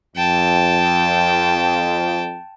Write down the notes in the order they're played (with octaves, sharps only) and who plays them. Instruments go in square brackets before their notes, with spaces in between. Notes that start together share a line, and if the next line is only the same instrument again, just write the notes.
[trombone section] F2 [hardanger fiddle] G5 A5